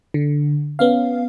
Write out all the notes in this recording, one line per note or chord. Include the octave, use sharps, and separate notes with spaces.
D3
B3 C#4 F5